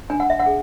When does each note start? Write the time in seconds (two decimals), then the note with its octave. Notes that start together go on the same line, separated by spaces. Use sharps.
0.10 D4 G#5
0.20 F#5
0.30 E5
0.39 F#5
0.46 G#4